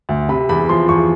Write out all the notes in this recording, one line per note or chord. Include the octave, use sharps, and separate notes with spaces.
D2
C3 B5
E2 B5
F3 C6
E2 C#6